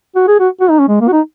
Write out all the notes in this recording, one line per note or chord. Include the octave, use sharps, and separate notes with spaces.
F#4
G#4
F#4
F#4
D#4
C#4
G#3
A#3
F#4
D#4